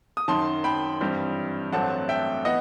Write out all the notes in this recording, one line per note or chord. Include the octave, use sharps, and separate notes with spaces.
D#6
F#2 D#3 F#3 A5 C6
G5 B5
G2 E3 G3 C4
A1 G2 F#3 A3 C4 F#5 A5
E5 G5
E3 B3 D#5 F#5